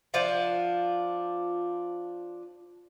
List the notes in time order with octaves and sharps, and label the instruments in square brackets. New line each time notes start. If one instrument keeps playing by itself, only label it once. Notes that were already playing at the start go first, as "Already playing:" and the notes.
[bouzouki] F3 D4 F4 F#5